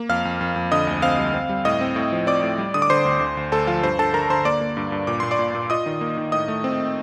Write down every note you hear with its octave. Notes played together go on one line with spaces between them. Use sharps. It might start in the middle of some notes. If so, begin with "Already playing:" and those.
Already playing: A#3
F2 F5 F6
F2
F2
F2
D3 D#5 D#6
D2
C4 F5 F6
G3
C4
G3
A2 D#5 D#6
C4
A2
F3
C4 D5 D6
A2
G3
D3 D#6
D6
D3 C5 C6
D2
D2
D2
D2 A4 A5
F3 F4 F5
G2 C5
D3 A4 A5
D3 A#4 A#5
D3 C5 C6
A#3 D5 D6
A#3
G2
G2
A#2 D6
A#2 C6
D5 D6
A#2
A#2
F4 D#5 D#6
D#3
A#3
D#3
A2 D#5 D#6
A3
C4